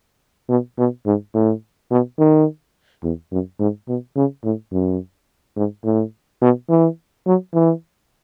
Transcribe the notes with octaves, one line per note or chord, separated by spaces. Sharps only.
B2
B2
G#2
A2
B2
D#3
E2
F#2
G#2
B2
C#3
A2
F#2
G#2
A2
B2
E3
F#3
E3